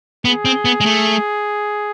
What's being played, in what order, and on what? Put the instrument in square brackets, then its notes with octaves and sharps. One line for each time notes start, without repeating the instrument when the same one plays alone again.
[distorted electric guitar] B3 [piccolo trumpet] G#4
[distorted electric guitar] C4
B3
G#3
A3